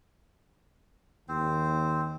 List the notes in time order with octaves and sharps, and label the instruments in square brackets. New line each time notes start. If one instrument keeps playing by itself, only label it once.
[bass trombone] D#2 [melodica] C4 C5